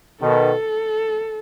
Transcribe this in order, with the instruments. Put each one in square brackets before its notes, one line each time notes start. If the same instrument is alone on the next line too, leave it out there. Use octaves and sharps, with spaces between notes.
[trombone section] B2 D#3 [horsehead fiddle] A4